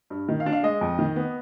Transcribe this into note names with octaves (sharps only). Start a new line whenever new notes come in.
G2
D#3
F5
D4
F5
G#3 D#5
F2
D#3
B3